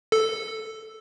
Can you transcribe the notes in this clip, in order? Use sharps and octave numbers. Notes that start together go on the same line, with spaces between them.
A4